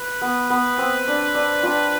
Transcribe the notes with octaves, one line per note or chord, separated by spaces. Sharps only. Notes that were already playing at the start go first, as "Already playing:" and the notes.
Already playing: B4
B3
B3
C4
D4
D4
D4 F4